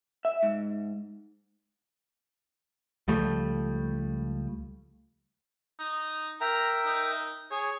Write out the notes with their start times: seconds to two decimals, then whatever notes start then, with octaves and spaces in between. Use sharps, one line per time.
0.25 E5
0.43 G#2
3.08 C#2 F3 G3 A3
5.79 D#4
6.41 A#4 E5 G5 A#5
6.85 D#4
7.51 G#4 C#5